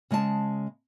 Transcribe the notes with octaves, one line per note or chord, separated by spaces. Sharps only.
C#3 G#3 D#5 A5